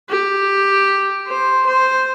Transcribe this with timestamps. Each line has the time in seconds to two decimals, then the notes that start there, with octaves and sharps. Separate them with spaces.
0.09 G4
1.28 C5
1.67 C5